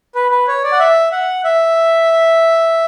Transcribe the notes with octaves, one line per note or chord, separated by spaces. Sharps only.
B4
B4
C#5
D5
F#5
E5
F#5
E5